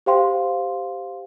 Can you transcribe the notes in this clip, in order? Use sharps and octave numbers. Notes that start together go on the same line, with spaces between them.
G4 C5 F5 G5 C6